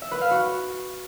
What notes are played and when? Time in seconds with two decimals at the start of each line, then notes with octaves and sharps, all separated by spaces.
0.02 E5
0.11 B4
0.21 F5
0.31 F#4